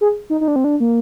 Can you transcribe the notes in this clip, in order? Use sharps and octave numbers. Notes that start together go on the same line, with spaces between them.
G#4
D#4
D#4
D4
C4
D4
A#3